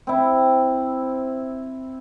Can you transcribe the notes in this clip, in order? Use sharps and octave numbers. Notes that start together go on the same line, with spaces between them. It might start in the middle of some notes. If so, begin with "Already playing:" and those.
C4 E4